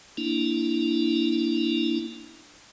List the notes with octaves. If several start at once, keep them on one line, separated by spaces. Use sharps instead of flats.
A#3 D4 E4